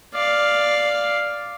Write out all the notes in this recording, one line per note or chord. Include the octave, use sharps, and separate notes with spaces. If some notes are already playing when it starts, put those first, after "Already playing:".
D5 F5